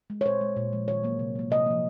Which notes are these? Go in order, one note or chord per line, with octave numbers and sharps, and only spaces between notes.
G#3
C#5
A#2 C5
G#3
A#2
F3 G#3
D#3 C#5
F#3 A#3
C3
F#3 A#3
C3 D#5
F3 A#3